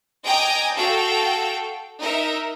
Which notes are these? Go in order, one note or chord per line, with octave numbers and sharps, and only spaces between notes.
D#5 G5 G#5 A#5 D6 D#6
F#4 A4 F5 G5
D#4 A#4 D#5 E5